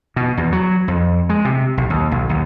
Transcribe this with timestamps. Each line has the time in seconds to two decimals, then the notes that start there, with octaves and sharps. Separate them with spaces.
0.16 B2
0.37 E2
0.52 F#3
0.88 F2
1.29 G#3
1.45 C3
1.77 B1
1.90 D#2
2.11 B1
2.29 D#2